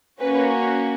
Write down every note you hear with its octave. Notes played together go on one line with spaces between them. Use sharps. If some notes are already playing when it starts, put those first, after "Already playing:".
A#3 C#4 F#4 B4